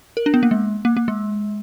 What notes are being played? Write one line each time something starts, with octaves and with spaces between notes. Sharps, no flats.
A#4
D4
B3
A#3
G#3
A#3
A#3
G#3